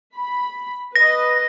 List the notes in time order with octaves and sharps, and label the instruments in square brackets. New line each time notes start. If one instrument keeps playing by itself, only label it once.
[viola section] B5
[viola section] B4 D#5 [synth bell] A#6